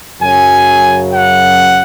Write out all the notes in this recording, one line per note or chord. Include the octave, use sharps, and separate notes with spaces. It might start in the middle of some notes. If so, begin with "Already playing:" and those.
F#2 C#3 F#3 G#5
F#5